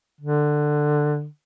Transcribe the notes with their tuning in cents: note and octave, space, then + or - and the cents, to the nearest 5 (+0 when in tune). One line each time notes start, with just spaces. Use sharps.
D3 +15